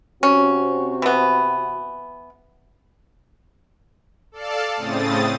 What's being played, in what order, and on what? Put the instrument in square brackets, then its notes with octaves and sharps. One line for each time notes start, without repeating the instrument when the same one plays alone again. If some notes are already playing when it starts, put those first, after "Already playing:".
[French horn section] C3 C4 F#4 [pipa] C#4
[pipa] E3 B3
[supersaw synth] A4 D5 F5 A5
A2 C#3 C4 D#6 A6